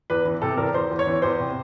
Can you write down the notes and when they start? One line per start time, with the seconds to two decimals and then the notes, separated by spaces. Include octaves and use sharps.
0.10 E2 B4
0.25 E3
0.42 C3 A4
0.57 E2 A#4
0.74 E2 C5
0.91 E2
0.99 C#5
1.07 E3
1.22 E2 C5
1.39 C3